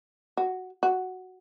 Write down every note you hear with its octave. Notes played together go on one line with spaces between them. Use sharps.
F#4
F#4